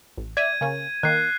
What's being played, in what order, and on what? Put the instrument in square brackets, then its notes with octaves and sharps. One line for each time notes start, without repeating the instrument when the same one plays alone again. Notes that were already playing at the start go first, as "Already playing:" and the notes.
[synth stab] A1
[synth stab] D5 E5 [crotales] G#6 D#7
[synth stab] C#3 A#3 C#4
[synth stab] D#3 A#3 [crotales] F#6 C7